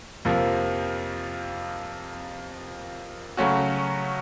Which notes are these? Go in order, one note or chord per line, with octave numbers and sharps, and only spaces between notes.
F2 C3 F3 A#3
C#3 F#3 A3 C#4 F#4